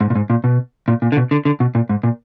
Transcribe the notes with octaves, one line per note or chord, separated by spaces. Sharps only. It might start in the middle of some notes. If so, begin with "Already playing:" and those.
G#2
A#2
G#2
A#2
B2
A#2
A#2
D3
B2
D3
D3
B2
A#2
G#2
A#2